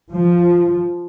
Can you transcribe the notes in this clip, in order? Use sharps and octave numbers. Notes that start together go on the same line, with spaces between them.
F3